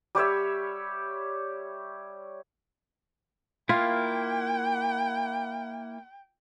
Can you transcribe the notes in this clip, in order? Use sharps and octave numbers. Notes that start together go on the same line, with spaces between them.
G3 G4 C#5 E5
A#3 E4 F4 G5